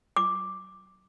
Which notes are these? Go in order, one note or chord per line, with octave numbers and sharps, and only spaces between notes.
D6